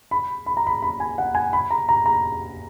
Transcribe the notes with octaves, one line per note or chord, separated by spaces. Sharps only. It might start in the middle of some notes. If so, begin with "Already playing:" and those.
B5
B5
A#5
B5
B5
G#5
F#5
G#5
B5
A#5
A#5
A#5